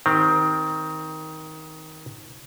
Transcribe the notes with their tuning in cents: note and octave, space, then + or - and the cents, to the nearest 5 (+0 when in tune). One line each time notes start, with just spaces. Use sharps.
D#3 +15 C4 +0 G4 +0